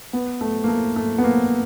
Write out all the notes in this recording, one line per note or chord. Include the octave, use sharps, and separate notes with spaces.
B3
A3
A#3
A3
A3
B3
A#3